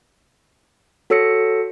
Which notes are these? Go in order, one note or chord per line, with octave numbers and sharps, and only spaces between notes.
F#4 A4 C#5 E6 A#6 C#7